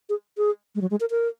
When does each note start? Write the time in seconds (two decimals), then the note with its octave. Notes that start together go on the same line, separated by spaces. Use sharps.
0.09 G#4
0.37 G#4
0.75 G#3
0.81 F#3
0.91 G#3
1.00 A#4
1.10 A#4